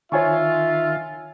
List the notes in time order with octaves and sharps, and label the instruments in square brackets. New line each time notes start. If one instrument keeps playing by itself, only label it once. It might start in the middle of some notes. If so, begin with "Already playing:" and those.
[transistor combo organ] D#3 [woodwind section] F4 [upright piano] C#5 G#5 C#6 [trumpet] E5